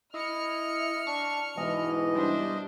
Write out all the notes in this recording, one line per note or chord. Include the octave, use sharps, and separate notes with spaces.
E4 D#5 F6 C#7
D4 C#6
G#2 B2 E3 G#3 D#5
G3 D4 C5